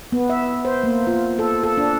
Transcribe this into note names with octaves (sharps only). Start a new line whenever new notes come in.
B3
E5
C5
A#3
F4
A4
A4
D4